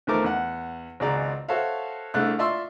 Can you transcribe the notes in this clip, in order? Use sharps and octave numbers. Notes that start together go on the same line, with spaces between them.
E2 D#3 F3 A3 A#4 D6
E2 F#5
G#1 C#2 F#4 G#4 D5 A#5
F#4 A4 C5 C#5 E5 F5
C2 A3 D4 G#4 F#6
F4 D5 E5 C6 C#6 E6